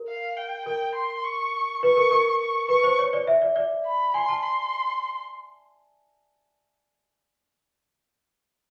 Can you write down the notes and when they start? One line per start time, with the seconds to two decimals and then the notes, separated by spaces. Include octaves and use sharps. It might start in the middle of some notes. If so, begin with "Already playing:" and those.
Already playing: A#4
0.08 F5
0.37 G5
0.66 A#4 G5
0.96 C6
1.24 C#6
1.83 B4 C#6
1.97 A#4
2.11 A#4
2.41 C#6
2.69 B4 C#6
2.83 C5
2.99 C#5
3.13 D5
3.27 E5
3.42 D5
3.56 D5
3.86 B5
4.14 G#5 C6
4.29 A5
4.43 C6